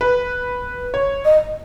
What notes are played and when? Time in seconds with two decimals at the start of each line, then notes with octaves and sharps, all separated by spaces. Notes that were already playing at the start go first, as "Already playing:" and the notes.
0.01 B4
0.94 C#5
1.25 D#5